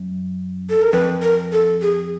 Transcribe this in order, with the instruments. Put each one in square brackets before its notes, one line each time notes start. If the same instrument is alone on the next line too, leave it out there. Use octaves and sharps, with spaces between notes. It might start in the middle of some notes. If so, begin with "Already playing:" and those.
Already playing: [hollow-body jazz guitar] F#2
[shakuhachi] A4
A#4
[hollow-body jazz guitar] F2 [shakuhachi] B4
[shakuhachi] A#4
A4
G#4